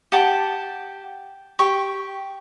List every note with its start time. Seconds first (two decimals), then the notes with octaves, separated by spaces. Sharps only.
0.12 G4 F#5 A5 D6
1.59 G4 C#6